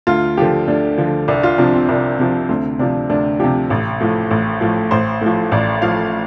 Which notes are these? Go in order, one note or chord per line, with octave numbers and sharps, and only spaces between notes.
D2 F4
D3 F3 G4
D2 D4
D3 F3
C2 D4
F4
C3 F3 D4
C4
C2 D4
C3 F3
D2 C4
C3 F3 D4
D2 D4
C3 F3 G4
A1
A2 F3
A1
A2 F3
A1 C5
A2 F3
A1 D5
A2 F3 F5